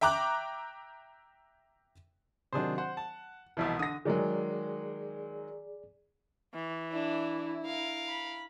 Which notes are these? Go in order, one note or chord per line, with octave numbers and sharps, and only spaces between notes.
E5 G5 A#5 D6 F#6
C3 D#3 F#3 D4 G#4 C5
C5 F#5
A5
C2 B2 E3 F3 E4 D#5
D3 D#6 A#6
D#3 F#3 G#3 G#4 D5
E3
D4 E4
A#4 F5
B5